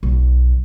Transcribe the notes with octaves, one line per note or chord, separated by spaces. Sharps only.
B1